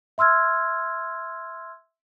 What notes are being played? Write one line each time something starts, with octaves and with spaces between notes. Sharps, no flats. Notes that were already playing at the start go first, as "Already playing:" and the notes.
E5 C6 E6 F6 G#6